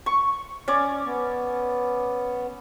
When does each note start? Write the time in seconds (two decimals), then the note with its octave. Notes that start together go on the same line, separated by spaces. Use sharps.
0.06 C#6
0.68 C#4 D5
1.05 B3